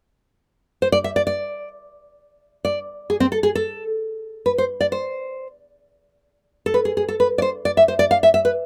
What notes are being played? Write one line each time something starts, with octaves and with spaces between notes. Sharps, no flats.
C5
D5
E5
D5
D5
D5
G#4
C4
A4
G#4
A4
B4
C5
D5
C5
A4
B4
G#4
G#4
A4
B4
D5
C5
D5
E5
C5
D5
F5
E5
E5
B4